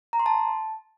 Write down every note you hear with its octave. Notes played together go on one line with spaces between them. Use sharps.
A#5
C6
A5